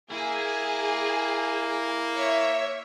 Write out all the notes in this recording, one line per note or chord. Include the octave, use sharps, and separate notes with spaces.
A#3 E4 G#4
C#5 E5